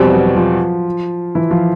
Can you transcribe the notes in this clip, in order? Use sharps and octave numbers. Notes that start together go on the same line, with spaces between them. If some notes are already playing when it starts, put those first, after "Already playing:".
Already playing: E2 B2 F3 G3 C4 F4
F#3 F#4
F3 F4
E3 E4
F3 F4